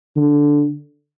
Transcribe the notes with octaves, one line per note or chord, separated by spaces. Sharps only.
D3